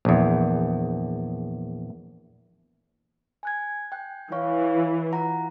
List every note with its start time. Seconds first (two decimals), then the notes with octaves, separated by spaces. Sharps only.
0.05 A#1 E2
3.43 G#5 F#6 G#6
3.92 G5 F#6
4.32 E3 C#5 F5 C#6
5.12 F4 F#5 A#5